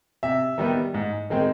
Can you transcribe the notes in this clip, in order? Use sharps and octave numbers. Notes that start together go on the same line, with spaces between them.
C3 E5
D#3 G3 B3
G#2
D#3 G#3 C4